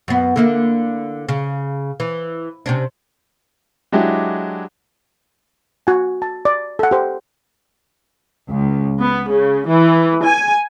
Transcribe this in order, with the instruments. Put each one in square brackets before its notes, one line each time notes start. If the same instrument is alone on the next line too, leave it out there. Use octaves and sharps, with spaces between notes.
[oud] F#2 B3
D3 A#3 E4
C#3
E3
C3 C#4 D4
[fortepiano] F#3 G#3 D4 E4 G4
[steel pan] F#4 G#5
A5
D5
A4 F#5
G4 C5
[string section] C#2
B3
C#3
E3
G#5